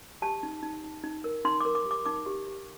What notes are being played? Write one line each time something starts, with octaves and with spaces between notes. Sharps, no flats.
G4 A5
D#4
D#4
D#4
D#4
A#4
D#4 C6
A#4 D6
D6
G4
D6
D#4 D6
G4
G4